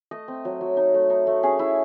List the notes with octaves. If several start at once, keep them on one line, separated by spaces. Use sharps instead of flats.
A3 D#5
C4
F#3
F#3
D#4
A3
D#4
A3
C#4 G#4
E4